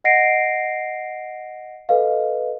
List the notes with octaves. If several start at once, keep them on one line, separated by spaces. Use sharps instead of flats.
D#5 F#5 A#6 C7 D7
A4 B4 D#5 F5